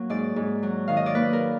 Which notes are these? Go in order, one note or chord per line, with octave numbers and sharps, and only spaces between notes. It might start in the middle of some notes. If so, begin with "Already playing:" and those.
Already playing: F#3 A#3
G#2 D5
G#2
F#3
D#3 F5
D#5
D5
A#3 B4
A#4